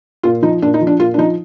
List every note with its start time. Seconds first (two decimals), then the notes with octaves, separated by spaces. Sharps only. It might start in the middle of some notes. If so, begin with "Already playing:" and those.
0.23 A#2 F4
0.42 F3 D#4
0.62 A#2 D4
0.74 D#4
0.81 F3
0.87 D4
0.99 A#2 F4
1.14 D4
1.18 F3 D#4